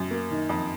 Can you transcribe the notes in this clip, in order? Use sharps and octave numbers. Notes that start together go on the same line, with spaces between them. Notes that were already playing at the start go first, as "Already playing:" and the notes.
Already playing: F#2
A#3
D#3
F2